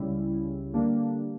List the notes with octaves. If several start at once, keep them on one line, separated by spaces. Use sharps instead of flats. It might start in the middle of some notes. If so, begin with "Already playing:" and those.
Already playing: C#2 C#3 G3 C#4 E4
D3 G3 A#3 D4